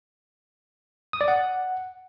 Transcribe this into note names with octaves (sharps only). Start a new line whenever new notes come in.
D#6
D5
F#5